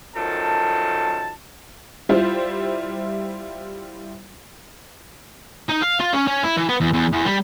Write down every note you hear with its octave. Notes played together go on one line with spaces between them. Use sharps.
F#2 D#3 F3 A4 A5
G3 E4 F4 C5
D#4
F5
F4
C#4
C#4
E4
E3
B3
E2
E2
E2
G3